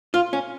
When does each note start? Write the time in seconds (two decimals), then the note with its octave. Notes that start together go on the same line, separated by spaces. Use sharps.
0.14 F4
0.33 C#4